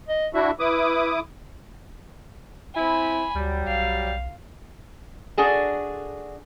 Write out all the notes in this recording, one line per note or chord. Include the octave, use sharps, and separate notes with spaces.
D#5
D4 E4 F#4 E5
E4 B4 D6 D#6
C4 E4 G#5 B5
D2 F#3 G3
B1 F5
D4 F#4 G#4 A4